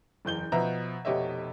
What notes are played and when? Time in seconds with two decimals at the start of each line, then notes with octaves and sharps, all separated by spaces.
0.25 F#1 E2 G6 G7
0.52 B2 F3 B4 E5 A#5
1.05 F1 B2 G4 C#5 D#5 E5